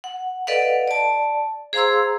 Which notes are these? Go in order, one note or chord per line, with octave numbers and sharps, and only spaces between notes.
F#5
A4 B4 D5 D#5 F5 F#5
D5 A5
G#4 C5 F5 A#5 C6 E6